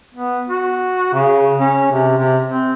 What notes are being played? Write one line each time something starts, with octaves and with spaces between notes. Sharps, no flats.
B3
F#4
C#3
C#4
C3
C3
C4